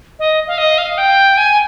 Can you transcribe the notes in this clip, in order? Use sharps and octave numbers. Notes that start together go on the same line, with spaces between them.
D#5
F5
D#5
F5
G5
G#5